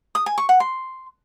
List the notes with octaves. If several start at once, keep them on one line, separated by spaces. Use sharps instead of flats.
D#6
G#5
C#6
F#5
C6